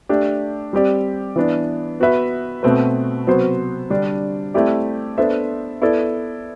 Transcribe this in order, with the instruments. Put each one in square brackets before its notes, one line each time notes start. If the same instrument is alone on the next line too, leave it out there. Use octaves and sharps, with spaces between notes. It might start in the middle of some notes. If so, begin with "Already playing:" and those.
[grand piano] A3 D4 G4
G3 C4 G4 D5
E3 B3 D4
B3 F#4 B4 E5
B2 A3 C4 F#4 B4
C3 F#3 B3 F#4 C5
D3 G3 D4
A3 C4 E4 G4 D5
B3 D4 A4 C5 E5
B3 E4 A4 D5